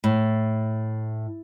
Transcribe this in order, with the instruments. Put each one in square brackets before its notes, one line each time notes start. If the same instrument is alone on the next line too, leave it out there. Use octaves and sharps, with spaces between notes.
[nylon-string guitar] A2